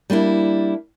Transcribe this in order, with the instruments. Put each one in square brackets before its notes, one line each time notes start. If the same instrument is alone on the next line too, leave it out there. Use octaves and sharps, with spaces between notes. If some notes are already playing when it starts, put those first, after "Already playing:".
[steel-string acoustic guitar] G3 A#3 D4 E4